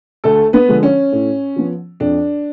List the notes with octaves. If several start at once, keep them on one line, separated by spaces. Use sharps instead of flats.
D2 A3 A4
B3 B4
D3 F3 G#3
C#4
A2
F3 B3
F2 D4